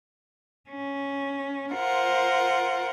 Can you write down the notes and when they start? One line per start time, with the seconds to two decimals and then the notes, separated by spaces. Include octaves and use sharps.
0.70 C#4
1.73 F4 A#4 C5 F#5